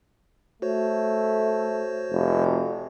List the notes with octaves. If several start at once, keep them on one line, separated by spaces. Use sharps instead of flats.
A3 F#4 C5 C#5
F1